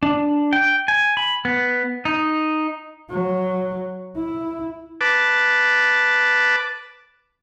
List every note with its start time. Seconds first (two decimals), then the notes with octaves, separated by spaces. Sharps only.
0.03 D4
0.53 G5
0.88 G#5
1.17 B5
1.45 B3
2.05 D#4
3.10 F#3
4.16 E4
5.01 B4 A5 D6